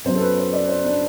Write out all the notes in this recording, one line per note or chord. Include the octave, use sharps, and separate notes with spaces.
F#2 F#3 B3 C5
A4
B4
C5
D5
C5
D4